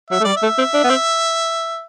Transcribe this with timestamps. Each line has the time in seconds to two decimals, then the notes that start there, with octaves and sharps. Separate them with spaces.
0.10 F#3 E5
0.20 A3
0.24 G3 D5
0.37 E5
0.43 A3
0.58 C4
0.74 D4
0.84 B3
0.90 C4